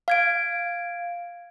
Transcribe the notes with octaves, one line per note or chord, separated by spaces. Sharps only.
F5 G#6 D7